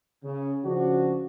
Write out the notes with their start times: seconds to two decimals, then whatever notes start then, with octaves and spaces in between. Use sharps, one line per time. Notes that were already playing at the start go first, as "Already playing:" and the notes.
0.24 C#3
0.65 C#3 F3 D4 F#4